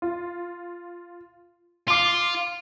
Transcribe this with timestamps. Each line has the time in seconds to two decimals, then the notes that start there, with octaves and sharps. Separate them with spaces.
0.02 F4
1.88 F4 C6 D6 C7